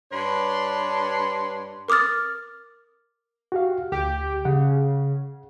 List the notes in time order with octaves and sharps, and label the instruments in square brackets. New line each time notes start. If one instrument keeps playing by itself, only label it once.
[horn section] G2 D4 B4 C#5 C6
[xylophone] A#4 D6 D#6 F6 A6
[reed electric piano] F#4 G4 F5
[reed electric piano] D2 [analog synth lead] G4
[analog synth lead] C#3 [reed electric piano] F#5